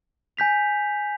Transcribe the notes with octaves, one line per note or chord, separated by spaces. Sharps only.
G#5 G6 B6 F7